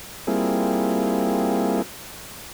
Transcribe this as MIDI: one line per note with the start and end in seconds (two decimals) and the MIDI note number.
0.27 1.82 55
0.27 1.82 58
0.27 1.82 60
0.27 1.82 64
0.27 1.82 65
0.27 1.82 68